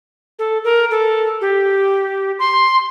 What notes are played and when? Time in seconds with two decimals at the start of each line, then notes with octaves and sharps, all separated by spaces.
0.39 A4
0.64 A#4
0.91 A4
1.41 G4
2.39 C6